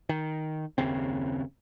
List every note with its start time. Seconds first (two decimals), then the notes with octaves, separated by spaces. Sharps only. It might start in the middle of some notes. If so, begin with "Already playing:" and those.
0.09 D#3
0.78 F#1 D#2 C#3 C4